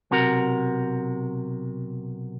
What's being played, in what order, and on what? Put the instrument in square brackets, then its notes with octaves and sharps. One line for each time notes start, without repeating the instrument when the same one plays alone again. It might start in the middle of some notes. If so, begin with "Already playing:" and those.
[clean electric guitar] B1 C3 F#4 A#4